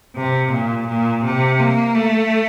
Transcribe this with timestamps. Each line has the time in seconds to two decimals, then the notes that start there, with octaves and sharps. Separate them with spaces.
0.16 C3
0.52 A#2
0.88 A#2
1.24 C3
1.60 A#3
1.95 A3